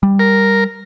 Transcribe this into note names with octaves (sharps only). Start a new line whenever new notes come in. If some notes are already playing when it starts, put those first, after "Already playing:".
G3
A#4